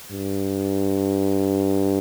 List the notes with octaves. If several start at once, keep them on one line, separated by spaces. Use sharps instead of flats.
G2